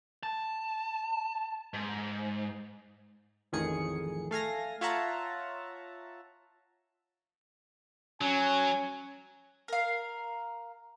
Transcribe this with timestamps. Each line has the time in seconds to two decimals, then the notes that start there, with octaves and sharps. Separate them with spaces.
0.23 A5
1.74 G#2
3.52 A1 F2 A2 D#3 G#4 C#7
4.31 A3 F5 G#5 A#6
4.81 F4 C#5 E5 F#5 A5 A#5
8.21 F#3 C#4 G#5
9.68 A#4 F5